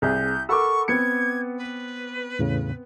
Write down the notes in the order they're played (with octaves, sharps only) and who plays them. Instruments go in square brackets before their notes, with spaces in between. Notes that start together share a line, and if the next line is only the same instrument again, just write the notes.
[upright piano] C2 [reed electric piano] C4 G#4 [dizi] G6
[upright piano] A4 A#4 D6 [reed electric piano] F#5 B5 E6 [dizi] C#6
[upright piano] B3 C4 C#7 [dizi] G#6
[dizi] B4
[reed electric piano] E2 A2 C#3